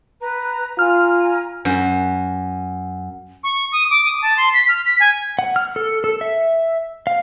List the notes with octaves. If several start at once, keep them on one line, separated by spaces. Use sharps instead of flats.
B4 A#5
F4 G#5 A#5 F6
F#2
C#6
D#6
D6
D#6
A5
C6
B6
F6
B6
G#5
F#5
F6
A4
A4
E5
F5